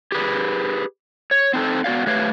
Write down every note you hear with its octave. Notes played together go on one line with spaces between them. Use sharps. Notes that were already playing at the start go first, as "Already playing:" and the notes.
G4 G#4 B4
C#5
C4 D#4 G#4 A4
B3 F#4 D5 F5
A3 G4 B4 C#5 F5